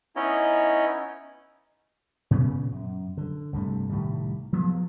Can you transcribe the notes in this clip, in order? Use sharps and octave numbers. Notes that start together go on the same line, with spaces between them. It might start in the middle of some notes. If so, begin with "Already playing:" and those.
B3 C#4 D#4 E4 C#5 D#5
A#2 C#3 B3 C#4
F#2
D3
C2 G2 C3 A3
C2 A2 D#3 G3
F3 F#3 G#3 B3